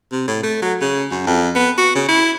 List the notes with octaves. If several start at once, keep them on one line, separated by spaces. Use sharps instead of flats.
C3
A2
A3
F#3
C#3
F#2
F2
B3
F#4
C#3
E4